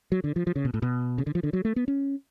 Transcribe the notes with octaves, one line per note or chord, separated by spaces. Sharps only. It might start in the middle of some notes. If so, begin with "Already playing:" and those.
F#3
D3
F3
F3
C#3
B2
A2
B2
C#3
D3
F3
D3
F#3
A3
B3
C#4